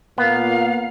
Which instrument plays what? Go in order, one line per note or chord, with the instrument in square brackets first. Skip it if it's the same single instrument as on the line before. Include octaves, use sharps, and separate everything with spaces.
[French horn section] A#2 A#3 [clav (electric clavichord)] B3 [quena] F5